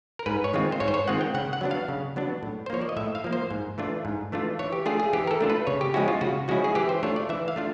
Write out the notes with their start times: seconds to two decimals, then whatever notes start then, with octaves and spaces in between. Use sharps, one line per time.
0.19 A#4
0.26 G#2 B4
0.44 C#5
0.53 D#3 G#3 C4 F4
0.72 C5
0.80 G#2 C#5
0.88 C5
0.94 C#5
1.08 D#3 G#3 C4 F4 F#5
1.21 G5
1.34 C#3 F#5
1.53 F#5
1.61 F#3 B3 D4
1.71 F5
1.88 C#3
2.16 F#3 B3 D4
2.43 A2
2.66 C5
2.70 F3 A#3 C#5
2.82 D5
2.89 D#5
2.97 A2 E5
3.15 F5
3.24 F3 A#3
3.33 C5
3.51 G#2
3.78 E3 A3 D4 F4
4.05 G#2
4.32 E3 A3 D4 F4
4.59 E3 C#5
4.73 G4
4.86 A3 D4 F4 G#4
5.00 G#4
5.13 E3 G4
5.27 A#4
5.31 A4
5.41 A3 D4 F4
5.50 B4
5.67 C#3 C#5
5.81 G4
5.94 F3 G#3 C#4 E4 F#4
6.08 F4
6.21 C#3 F#4
6.48 F3 G#3 C#4 E4 F#4
6.64 G#4
6.75 E3 G4
6.89 C5
7.03 A3 D4 F4 C#5
7.16 D5
7.29 E3 E5
7.48 F5
7.56 A3 D4 F4